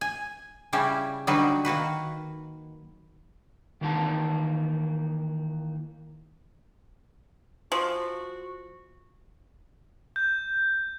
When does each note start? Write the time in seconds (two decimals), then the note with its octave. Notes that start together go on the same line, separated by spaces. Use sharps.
0.01 G#5
0.73 C#3 G3 C#4 E4 G4 E5
1.27 D3 F#3 G3 D#4 F#4 B4
1.65 D#3 A#3 F#4 B4
3.81 D#3 E3 A#3 D#4 A5
7.72 F3 F#4
10.16 G6